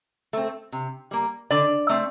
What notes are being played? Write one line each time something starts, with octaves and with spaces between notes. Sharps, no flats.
A3 C4
C3
G3 A#3
D3 D5
A3 C4